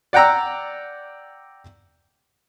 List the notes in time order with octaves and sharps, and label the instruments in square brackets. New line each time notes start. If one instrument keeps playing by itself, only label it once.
[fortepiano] D5 F#5 G5 A#5 E6